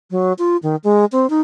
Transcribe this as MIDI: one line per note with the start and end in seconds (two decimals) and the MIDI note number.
0.11 0.33 54
0.38 0.57 65
0.63 0.76 51
0.84 1.05 56
1.12 1.29 60
1.30 1.41 63